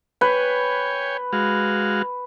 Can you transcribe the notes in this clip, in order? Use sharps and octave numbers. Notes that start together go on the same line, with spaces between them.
B4 C#5 G5 G#5
G#3 F#4 F5